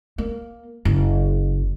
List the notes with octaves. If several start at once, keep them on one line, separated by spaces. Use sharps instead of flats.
A#3
F#1